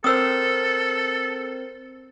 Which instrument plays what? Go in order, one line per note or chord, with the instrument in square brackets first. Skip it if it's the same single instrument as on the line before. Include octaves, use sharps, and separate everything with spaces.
[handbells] C4 A#4 C5 [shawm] A4 [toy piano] D#6 E6